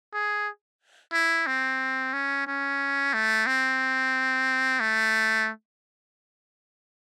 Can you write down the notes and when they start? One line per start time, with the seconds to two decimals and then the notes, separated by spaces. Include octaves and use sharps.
0.14 G#4
1.13 E4
1.47 C4
2.13 C#4
2.47 C#4
3.13 A3
3.47 C4
4.80 A3